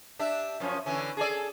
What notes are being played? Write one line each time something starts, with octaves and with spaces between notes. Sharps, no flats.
D4 G4 E5
F#2 F3 C#4
D3 E3 C#4
G#4 A4 D5